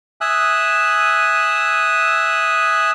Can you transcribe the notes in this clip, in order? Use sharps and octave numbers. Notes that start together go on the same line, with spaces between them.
E5 G#5 D#6 E6 F#6